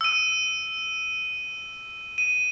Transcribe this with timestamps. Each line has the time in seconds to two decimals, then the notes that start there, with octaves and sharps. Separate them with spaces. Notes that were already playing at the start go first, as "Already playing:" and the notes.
0.01 E6 D#7
2.18 D#7